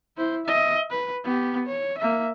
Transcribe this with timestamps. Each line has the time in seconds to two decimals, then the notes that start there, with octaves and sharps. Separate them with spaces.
0.17 E4 C5
0.46 D#5 E5
0.90 B4
1.24 B3 G4
1.66 C#5
1.98 A#3 E5